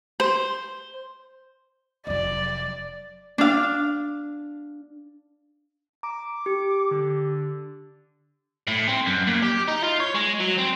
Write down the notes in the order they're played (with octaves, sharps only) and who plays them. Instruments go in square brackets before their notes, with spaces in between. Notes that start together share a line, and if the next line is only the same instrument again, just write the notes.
[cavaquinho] C5
[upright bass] F1 F#3 [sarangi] D5
[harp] D4 F5
[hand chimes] A#5 [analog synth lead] D6
[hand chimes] G4
[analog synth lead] D3
[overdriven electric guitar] A2
C4
F#2
A#2
G4
D#4
F4
C#5
G#3
F#3
C4